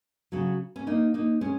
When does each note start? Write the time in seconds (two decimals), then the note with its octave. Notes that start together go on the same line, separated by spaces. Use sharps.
0.32 C#3 F#3
0.76 C#4
0.87 A#3 D#4
1.14 A#3 D#4
1.41 G#3 C#4